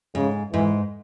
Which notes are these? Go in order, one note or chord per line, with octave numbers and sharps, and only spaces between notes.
G#2 C#3
G#2 E3